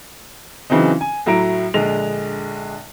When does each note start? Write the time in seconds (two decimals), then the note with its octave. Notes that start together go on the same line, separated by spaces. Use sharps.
0.70 C#3 E3 F#3 C4 D#4
1.01 G#5
1.26 A2 F#3 E4 A#5 D7
1.74 A#1 D3 G#3 F7